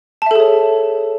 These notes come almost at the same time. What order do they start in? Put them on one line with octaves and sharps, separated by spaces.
A5 E5 A4 G#4 C#5